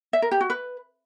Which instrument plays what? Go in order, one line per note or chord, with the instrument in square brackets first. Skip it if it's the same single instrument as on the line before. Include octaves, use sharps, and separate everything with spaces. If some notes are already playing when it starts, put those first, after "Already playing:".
[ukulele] E5
A#4
G4
F#4
B4